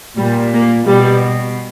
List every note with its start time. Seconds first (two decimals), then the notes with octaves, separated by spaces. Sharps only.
0.17 A#2 G3
0.53 A#3
0.87 B2 G3